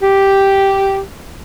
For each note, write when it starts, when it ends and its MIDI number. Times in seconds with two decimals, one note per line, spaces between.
0.02 1.00 67